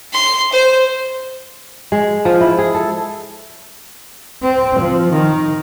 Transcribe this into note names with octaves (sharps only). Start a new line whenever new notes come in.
C6
C5
G#3
F3
E4
G#4
A4
C4
F3
D#3